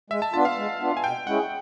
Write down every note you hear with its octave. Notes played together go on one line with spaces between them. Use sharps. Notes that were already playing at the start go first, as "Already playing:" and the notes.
G#3 E5
A5
B3 D4 F4 A5
F5
G#3
B3 D4 F4
G#5
B2 G5
G#3 C#4 E4 G#4 F#5